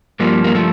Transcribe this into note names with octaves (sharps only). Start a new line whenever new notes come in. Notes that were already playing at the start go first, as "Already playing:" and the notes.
G2 F3 G3 A#3
A#3
F3 A3